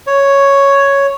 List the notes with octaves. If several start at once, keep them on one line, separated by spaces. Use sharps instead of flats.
C#5